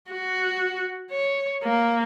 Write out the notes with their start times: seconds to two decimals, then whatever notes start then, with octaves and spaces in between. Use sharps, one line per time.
0.11 F#4
1.11 C#5
1.64 A#3